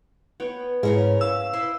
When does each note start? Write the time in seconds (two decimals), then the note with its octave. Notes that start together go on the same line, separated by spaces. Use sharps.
0.40 B3 C#5 G5
0.83 G#2 C#3 C#4 E4 A#4
1.21 F5 E6
1.53 E4 B4 C5